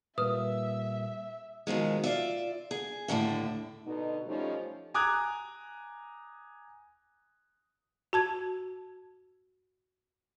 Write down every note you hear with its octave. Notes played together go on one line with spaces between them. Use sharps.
A#2 G3 A#3 B4 E5 D#6
B2 D#3 F3 G#3
F4 D5 E5
G#4
D#2 A2 D3 D#3 E5
B2 D3 D#4
F3 G3 A3 C#4 D#4
G#5 A#5 D6 D#6 F#6 G#6
F#4 A5 G#6